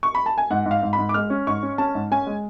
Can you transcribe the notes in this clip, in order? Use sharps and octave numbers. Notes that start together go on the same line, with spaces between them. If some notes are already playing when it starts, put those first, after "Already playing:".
C#6
B5
A5
G#5
G#2 F#5
G#2
F5
G#2
B5
G#2
D6
G#3 F6
C#4
G#2 C#6
C#4
C#4 A5
G#2
C#4 G#5
G#3